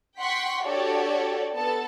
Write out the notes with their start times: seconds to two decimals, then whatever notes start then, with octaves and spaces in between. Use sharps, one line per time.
0.19 F#5 G5 C6 C#6 B6
0.64 D4 F#4 G4 A4 C#5 D5
1.55 B3 A4 A5